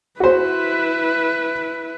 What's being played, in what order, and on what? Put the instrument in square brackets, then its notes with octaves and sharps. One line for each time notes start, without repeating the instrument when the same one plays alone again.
[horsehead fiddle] E4 B4 [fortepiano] F#4 C5